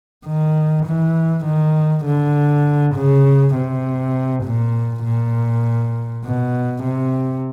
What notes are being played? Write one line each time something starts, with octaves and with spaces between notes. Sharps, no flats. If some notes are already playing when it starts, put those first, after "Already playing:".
D#3
E3
D#3
D3
C#3
C3
A#2
A#2
B2
C3